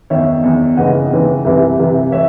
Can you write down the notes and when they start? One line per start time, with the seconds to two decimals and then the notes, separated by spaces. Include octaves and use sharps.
0.10 E2 D#3 C#5 E5
0.44 E2 D#3
0.77 D#2 C#3 E3 D#5 F#5
1.11 D#2 C#3 E3
1.45 C2 C3 E3
1.78 C2 C3 E3
2.11 E3 C#5 E5